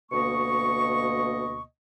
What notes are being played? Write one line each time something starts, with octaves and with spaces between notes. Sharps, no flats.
D2 B2 A#3 D#5 C#6